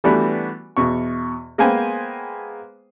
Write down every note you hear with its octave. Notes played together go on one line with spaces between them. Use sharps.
E3 G3 A3 B3 D4 F#4
E2 B2 C#6
G#3 A#3 B3 C5 G5 G#5